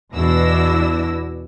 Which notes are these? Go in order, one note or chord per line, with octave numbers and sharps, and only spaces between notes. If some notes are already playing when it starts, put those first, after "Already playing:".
E2 B2 D4 E4 E6 A#6